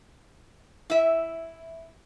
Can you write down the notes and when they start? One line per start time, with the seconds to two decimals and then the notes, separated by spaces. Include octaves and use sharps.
0.90 E4 E5